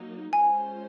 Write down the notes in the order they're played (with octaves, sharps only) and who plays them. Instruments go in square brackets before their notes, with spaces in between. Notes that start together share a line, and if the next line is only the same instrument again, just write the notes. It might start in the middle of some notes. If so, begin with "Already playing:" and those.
Already playing: [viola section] F#3 A#3 D#4
[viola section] G#3 C#4 F4 C5 [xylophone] G#5